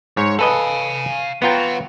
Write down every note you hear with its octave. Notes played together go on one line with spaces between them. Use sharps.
G#2 C#5
A4 B4 D#5 F5 G#5
B3 F4 F#5 G5 A#5